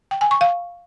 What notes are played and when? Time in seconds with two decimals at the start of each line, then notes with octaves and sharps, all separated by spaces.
0.11 G5
0.21 G#5
0.31 C#6
0.41 F5